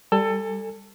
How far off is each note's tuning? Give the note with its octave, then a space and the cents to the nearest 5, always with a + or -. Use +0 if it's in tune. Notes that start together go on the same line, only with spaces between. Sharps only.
G3 +5 A4 +20 G#5 -15